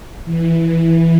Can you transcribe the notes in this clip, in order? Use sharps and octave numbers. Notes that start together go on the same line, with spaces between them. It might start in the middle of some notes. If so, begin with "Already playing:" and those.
E3